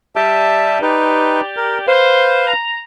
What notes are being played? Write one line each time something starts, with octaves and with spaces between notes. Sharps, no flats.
G3 G4 E5 A5
D#4 G4 B4 D5
A#4
B4 C5 F5
A#5